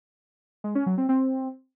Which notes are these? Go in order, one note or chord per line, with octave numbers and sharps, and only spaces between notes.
G#3
C#4
F#3
C4
C4